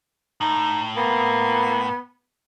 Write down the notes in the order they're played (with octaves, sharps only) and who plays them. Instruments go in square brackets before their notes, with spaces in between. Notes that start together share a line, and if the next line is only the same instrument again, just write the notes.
[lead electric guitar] A2 [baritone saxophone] D#4
[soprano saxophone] A#3 [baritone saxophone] B3